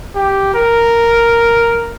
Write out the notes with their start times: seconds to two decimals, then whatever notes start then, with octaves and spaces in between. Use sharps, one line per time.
0.15 G4
0.54 A#4